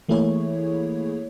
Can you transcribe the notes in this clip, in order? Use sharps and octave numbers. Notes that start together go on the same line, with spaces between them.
E3 A3 A#3 E4 G#4 C#5